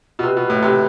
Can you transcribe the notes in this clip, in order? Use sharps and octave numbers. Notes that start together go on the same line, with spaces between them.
B2
C3 B4
B2
A2
C3